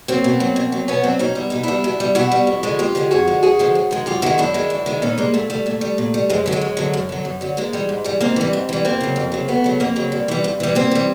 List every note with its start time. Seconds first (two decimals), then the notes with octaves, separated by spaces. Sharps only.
0.08 F#3 A#3 C4
0.24 B2
0.40 F#3
0.56 B2
0.72 F#3
0.88 B2 B3 C#4
1.03 F#3 C4 D4
1.19 B2 C#4 D#4
1.35 G3 E4
1.50 B2 D#4
1.63 G3 D4 E4
1.84 B2
2.00 G3
2.15 B2 E4 F#4
2.32 G3
2.47 F2
2.63 D3 F3 G#3
2.79 F2 F4 G4
2.95 D3 F3 G#3
3.11 F2 F#4 G#4
3.27 D3 F3 G#3
3.43 F2 F#4 G#4
3.59 D3 F3 G#3
3.75 F#2
3.91 D#3 G#3
4.06 F#2 F4 G4
4.22 D#3 G#3 E4 F#4
4.38 F#2 D4 E4
4.54 D#3 G#3
4.70 F#2
4.86 D#3 G#3
5.02 A#2 C#4 D#4
5.18 G3 G#3 A#3
5.34 A#2 A3
5.50 G3 A3
5.66 A#2 A3
5.81 G3
5.98 A#2
6.14 G3
6.29 F#2 G#3
6.46 D3 F#3
6.52 G#3
6.61 F#2
6.77 D3 F#3
6.93 F#2
7.09 D3 F#3
7.25 F#2
7.41 D3 F#3
7.57 G#2 G#3 A#3
7.73 E3 G3
7.89 G#2
8.04 E3 G3
8.21 G#2 A#3 C4
8.36 E3 G3
8.53 G#2
8.69 E3 G3
8.85 F2 A#3 C4
9.00 C#3 F#3
9.16 F2
9.32 C#3 F#3
9.48 F2 A3 B3
9.64 C#3 F#3
9.80 F2 A#3 C4
9.96 C#3 F#3
10.12 G2
10.28 E3 G3
10.44 G2
10.60 E3 G3
10.75 G2 A#3 C4
10.91 E3 G3